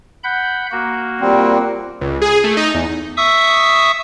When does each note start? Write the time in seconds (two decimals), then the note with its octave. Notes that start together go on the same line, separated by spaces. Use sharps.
0.24 F#5 B5 G6
0.71 A#3 F#4
1.21 A#2 G3 C4
2.01 C#2
2.22 G#4
2.44 A3
2.57 D#4
2.74 E2
3.17 E5 C#6 D#6 E6